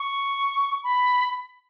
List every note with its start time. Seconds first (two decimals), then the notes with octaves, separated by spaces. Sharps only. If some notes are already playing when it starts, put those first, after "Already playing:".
Already playing: C#6
0.84 B5